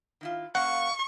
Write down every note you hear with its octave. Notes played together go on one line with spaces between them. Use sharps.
D#3 E4 F4
A#3 C#4 F5 F#5 C#6